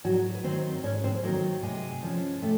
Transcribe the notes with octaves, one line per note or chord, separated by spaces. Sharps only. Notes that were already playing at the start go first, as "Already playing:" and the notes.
G#2 F#3 F#4
B4
D#3 F#3 C4 C5
G#2 C#4 C#5
C4 C5
D#3 F#3 A#3 A#4
C3 G#3 G#4
F3 G#3 C#4
C3 A3